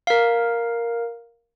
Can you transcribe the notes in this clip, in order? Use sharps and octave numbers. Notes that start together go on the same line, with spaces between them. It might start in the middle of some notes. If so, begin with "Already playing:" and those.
A#4 F5